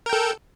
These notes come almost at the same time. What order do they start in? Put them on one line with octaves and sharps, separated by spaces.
A#4 G5 A4